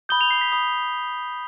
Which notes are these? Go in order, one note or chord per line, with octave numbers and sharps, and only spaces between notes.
B5 D#6 G6 G7
F7
C7
B6
B5 D#6 G6